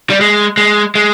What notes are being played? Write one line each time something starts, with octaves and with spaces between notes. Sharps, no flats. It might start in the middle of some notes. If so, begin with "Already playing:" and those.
G3
G#3
G#3
G#3